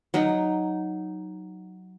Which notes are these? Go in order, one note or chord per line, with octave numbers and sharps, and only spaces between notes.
F#3 D#4